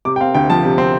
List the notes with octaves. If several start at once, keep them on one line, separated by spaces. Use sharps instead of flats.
C3 D6
G5
C4 F5
D2 G5
F3 A5
C3
C4